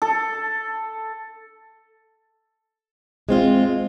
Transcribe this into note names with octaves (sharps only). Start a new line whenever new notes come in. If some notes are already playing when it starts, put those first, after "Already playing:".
A4
G#3 C4 F4